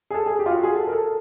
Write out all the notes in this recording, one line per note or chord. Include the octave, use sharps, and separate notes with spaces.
G#4
A4
G#4
G4
F4
F#4
G#4
A4
A#4
A4